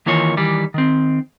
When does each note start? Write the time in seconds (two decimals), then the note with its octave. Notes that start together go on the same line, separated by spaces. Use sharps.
0.06 D#3 E3 A#3 F4 C#5
0.37 D#3 E3 G3 D5
0.74 D#3 C4